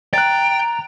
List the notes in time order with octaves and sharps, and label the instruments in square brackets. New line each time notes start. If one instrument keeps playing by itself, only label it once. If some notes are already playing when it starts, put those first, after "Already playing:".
[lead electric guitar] G5 [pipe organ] A#5 [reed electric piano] F#6 A6